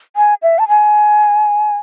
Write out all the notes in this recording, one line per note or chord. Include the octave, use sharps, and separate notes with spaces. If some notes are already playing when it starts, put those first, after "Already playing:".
G#5
E5
A5
G#5